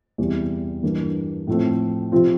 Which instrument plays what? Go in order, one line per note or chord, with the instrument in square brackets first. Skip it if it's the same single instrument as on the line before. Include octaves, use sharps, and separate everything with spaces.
[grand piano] E2 C3 G3
G2 E3 A#3 D4
A2 F3 A3 C4
C3 F3 C4 F4